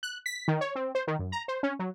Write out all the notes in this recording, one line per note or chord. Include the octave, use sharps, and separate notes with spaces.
F#6
B6
D#3
C#5
C4
C5
D#3
F#2
A#5
C5
C#4
F#3